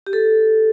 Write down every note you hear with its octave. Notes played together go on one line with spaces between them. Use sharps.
G4
A4